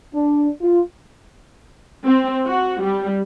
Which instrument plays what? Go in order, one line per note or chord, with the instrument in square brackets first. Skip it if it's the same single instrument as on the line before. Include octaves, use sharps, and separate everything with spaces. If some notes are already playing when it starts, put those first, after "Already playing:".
[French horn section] D4
F4
[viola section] C4
F#4
G3